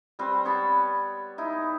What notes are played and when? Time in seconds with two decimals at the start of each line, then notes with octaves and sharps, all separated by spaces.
0.19 G3 C4 B4
0.45 B3 C#5 A5 B5
1.38 D#4 E4